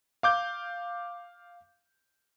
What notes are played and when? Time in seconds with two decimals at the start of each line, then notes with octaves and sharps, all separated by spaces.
0.23 F5 D6 G6